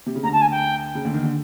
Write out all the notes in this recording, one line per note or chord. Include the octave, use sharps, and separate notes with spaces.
C3
C#3
D2 D3 A#5
A5
G#5
G5
C#3
D2 D3
D#2 D#3
D3